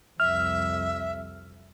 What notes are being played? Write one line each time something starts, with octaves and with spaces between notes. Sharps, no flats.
C2 F2 E5 F6